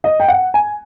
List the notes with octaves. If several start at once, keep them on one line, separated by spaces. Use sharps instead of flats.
D#5
G5
F#5
G#5